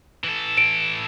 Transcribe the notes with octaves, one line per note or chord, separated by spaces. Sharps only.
E3 A4
D7